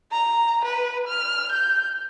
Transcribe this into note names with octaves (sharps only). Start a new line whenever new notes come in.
A#5
B4
F6
G6